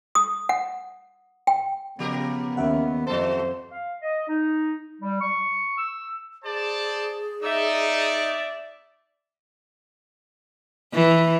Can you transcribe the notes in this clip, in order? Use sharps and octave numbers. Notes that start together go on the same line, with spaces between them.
D#6
F#5
G5
C#3 F3 B3 G4 A#4
D#2 C#4 E5 F#5
F2 F#3 A4 C5
F5
D#5
D#4
G3
C#6
E6
G#4 C5 D5 A5
D#4 D5 E5
E3